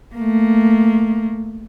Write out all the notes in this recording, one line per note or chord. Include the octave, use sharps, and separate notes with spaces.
A3 A#3